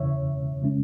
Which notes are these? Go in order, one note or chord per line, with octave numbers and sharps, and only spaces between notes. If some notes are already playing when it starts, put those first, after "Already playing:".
Already playing: E2 C#3 E3 C#5 E5
C#3 G#3 C#4